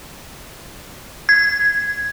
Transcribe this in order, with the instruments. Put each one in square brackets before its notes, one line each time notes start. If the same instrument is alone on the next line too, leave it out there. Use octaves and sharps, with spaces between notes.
[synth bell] G#6